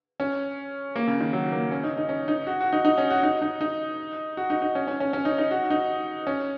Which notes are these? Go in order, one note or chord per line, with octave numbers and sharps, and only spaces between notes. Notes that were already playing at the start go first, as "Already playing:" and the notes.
C#4
A#3
C#3
D#3
F#3
A#3
C#4
D#4
D#4
C#4
D#4
F#4
F#4
D#4
D#4
C#4
F#4
D#4
D#4
D#4
F#4
D#4
D#4
C#4
C#4
C#4
C#4
D#4
D#4
F#4
D#4
C#4